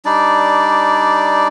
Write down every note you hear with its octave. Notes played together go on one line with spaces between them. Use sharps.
G3 D4 D#4 D5